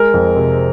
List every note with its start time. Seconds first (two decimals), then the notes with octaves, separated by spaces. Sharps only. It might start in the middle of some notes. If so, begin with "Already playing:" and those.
Already playing: G#3 A#4
0.14 F2
0.36 C3